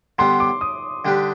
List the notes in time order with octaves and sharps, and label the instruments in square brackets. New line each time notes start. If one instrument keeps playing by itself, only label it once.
[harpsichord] D3 G3 B3 [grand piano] C6
[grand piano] D6
D#6
[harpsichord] D3 G3 D4 G4 B4